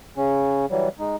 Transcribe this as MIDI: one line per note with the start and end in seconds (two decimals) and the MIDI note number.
0.17 0.66 49
0.17 0.66 61
0.71 0.88 52
0.71 0.88 54
0.71 0.88 55
0.99 1.16 56
0.99 1.16 63